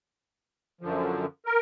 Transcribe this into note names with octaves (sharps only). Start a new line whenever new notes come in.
F#2 D3 F3
A#4